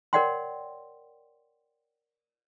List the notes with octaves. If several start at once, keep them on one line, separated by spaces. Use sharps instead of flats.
A#4 C#5 D5 F#5 G5 C6